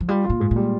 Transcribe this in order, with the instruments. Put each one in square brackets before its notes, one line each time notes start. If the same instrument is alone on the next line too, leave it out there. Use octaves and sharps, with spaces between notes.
[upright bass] F3
[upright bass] G3 [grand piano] F4
[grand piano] F4
[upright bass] A#2
[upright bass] G#2 [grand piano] G#3
[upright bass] A#2
[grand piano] G3